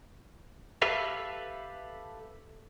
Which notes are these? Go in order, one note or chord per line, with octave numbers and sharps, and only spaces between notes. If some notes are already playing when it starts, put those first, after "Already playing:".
G4 A4 B4 E5 F5